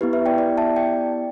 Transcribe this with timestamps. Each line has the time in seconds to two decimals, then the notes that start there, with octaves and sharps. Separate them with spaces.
0.01 B3 E4 G4 B4
0.13 B4 E5
0.26 D5 G5
0.38 D5 G5
0.58 E5 A5
0.76 D5 G5